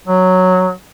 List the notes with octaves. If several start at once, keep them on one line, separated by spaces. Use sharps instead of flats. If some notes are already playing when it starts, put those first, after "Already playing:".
F#3